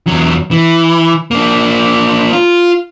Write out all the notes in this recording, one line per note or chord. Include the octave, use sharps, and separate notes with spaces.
E2 F#3
E3
A#3 D4
F4